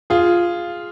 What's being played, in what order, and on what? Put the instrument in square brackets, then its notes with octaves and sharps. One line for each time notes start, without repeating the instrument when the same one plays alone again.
[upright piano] F4 G#4